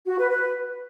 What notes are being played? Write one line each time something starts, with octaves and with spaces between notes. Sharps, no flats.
F#4
B4
B4